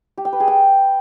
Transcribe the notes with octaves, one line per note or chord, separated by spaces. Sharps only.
G4
G5
B4
G#4
G5